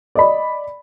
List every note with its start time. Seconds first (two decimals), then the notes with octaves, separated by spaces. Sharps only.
0.15 D5 D#5 B5